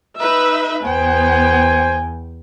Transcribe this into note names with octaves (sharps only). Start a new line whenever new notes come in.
D#4 B4 E5 E6
E2 B3 C5 G5 G#5